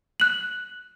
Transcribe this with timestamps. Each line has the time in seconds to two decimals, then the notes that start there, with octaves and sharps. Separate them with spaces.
0.20 F#6 F#7